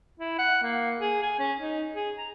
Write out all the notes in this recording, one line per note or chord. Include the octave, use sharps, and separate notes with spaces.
E4
F#5
A#3
G#4
G#5
C#4
D#4
G#4
A#5